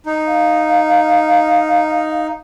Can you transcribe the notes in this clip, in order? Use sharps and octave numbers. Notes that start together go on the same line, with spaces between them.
D#4
F5